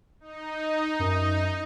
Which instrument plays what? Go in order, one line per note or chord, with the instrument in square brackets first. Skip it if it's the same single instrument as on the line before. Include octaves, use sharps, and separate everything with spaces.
[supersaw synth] D#4
[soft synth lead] F#2